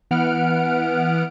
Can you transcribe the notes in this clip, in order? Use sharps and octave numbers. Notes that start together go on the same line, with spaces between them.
E3 B3 F#5 F6 D7